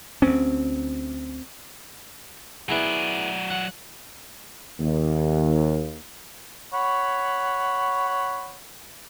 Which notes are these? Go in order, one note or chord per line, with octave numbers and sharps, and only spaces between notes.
D2 C4 C#4
F#3 B3 E4 G#4 D5
F#5
D#2
C#5 F#5 B5